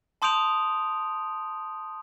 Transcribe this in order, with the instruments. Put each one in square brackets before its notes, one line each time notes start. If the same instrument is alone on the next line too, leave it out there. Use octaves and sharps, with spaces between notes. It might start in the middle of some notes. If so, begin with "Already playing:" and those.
[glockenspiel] A5 C6 D#6 G6 D7 F7